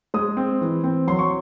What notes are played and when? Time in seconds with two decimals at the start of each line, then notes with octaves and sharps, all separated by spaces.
0.14 G#3 D#6
0.37 C4
0.61 E3
0.84 C4
1.07 F#3 C6
1.19 C#6